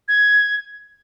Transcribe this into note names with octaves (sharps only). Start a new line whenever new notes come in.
G#6